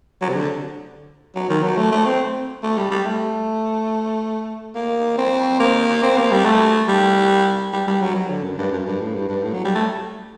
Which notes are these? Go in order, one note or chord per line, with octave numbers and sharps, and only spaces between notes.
F#3
C3
D3
F#3
D#3
F#3
A3
A3
C4
A3
G3
G3
A3
A#3
C4
A#3
C4
A#3
G3
A3
G3
G3
G3
F#3
F#3
D3
F#2
G2
F#2
G2
A2
G2
G2
A2
F#3
G3
A3